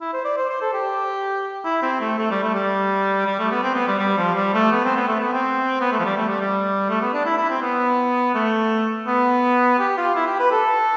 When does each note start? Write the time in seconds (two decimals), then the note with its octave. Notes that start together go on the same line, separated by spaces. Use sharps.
0.01 E4
0.13 C5
0.25 D5
0.37 C5
0.49 C5
0.61 A4
0.74 G4
1.64 E4
1.82 C4
2.01 A3
2.18 A3
2.31 G3
2.43 A3
2.54 G3
3.26 G3
3.39 A3
3.51 B3
3.63 C4
3.75 B3
3.88 G3
3.99 G3
4.18 F3
4.35 G3
4.54 A3
4.72 B3
4.84 C4
4.97 B3
5.08 A3
5.20 B3
5.33 C4
5.81 B3
5.92 A3
5.99 F3
6.05 G3
6.16 A3
6.29 G3
6.41 G3
6.90 A3
7.02 B3
7.13 D4
7.26 E4
7.38 E4
7.50 C4
7.62 B3
8.35 A3
9.07 B3
9.79 G4
9.97 F4
10.16 E4
10.27 G4
10.40 B4
10.52 A4